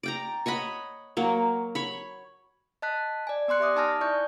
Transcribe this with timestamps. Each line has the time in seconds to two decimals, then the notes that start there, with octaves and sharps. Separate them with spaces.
0.03 D5 G5 A#5
0.46 C#5 D#5 F#5 B5
1.17 F#3 A#3
1.75 C#5 B5
2.82 D#5 A5 F#6 B6
3.27 D5 G#5
3.48 B3 D5 C6 F#6 C#7
3.60 G4 E5 D6 D#6
3.76 D#4 G#5 A5 D#6 F6 A#6
4.01 E4 D5 C#6 G6